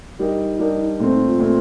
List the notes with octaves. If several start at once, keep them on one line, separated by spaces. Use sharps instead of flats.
G3 D4 D#4 G4 A#4 D#5
G3 D4 G4 A#4 D#5
A#2 A3 C4
D#4
F4
A#2 A3 C4